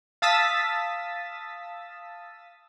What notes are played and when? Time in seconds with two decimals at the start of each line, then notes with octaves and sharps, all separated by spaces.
0.22 F5 A5 D#6 E6 A6 B6